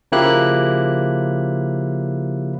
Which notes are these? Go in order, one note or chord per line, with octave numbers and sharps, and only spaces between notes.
C#3 F3 A#3 E4 G4 F#6